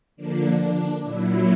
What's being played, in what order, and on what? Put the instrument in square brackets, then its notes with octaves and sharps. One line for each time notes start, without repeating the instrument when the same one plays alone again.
[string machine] D3 F3 A#3 D4
D4
A#2 F#3 E4